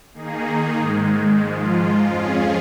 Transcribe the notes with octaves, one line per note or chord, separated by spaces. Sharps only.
D#3 A#3 D#4 G#4
G#2 D#3 G#3
G#2 F3 G#3 F4
F2 F3 C#4 F4 G#4